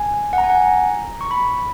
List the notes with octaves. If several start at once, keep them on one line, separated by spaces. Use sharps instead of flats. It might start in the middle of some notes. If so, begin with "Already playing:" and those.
Already playing: G#5
F#5
A#5
G#5
F#5
G#5
A#5
C#6
B5